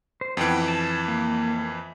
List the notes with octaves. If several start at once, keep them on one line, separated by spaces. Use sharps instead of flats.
C5
F2 E3 B3 G5
A5
A#3